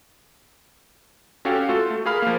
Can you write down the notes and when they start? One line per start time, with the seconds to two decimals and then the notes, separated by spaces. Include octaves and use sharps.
1.45 C#4 F#4 G4 A4 F5 G5
1.68 A3 F4 F#4 A4
1.90 A3
2.06 G#4 A#4 F5 B5 F6
2.22 F3 A#3